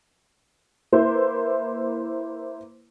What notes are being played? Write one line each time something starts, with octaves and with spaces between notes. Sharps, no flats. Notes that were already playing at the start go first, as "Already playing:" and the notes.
A#3 E4 B4 C5